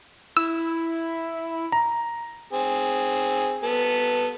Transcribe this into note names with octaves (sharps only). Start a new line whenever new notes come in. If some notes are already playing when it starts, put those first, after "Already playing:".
E4 E6
A#5
C4 G#4
B3 A4